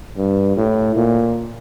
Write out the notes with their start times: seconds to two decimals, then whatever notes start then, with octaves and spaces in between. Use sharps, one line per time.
0.17 G2
0.57 A2
0.96 A#2